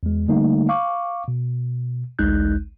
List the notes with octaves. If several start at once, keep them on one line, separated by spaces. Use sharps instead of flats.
E2 G#3
D3 G3 A3 A#3 D#4
F5 C#6 D6
B2
A1 D2 G#3 D#4 F#6 G6